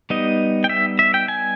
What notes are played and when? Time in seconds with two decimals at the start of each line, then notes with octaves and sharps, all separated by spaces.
0.10 G3 B3 D#4 D#5
0.64 G5
0.69 E5
0.99 E5
1.14 G5
1.28 G#5